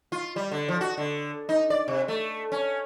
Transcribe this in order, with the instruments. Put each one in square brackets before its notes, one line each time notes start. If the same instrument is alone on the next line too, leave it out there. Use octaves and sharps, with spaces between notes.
[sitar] F4
G3
D3
F3
F#4
D3
D#4
D5
C3
A3
C#4